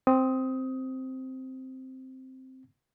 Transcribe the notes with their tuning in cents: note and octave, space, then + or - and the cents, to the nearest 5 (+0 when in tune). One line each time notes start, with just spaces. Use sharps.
C4 +0 D#6 +15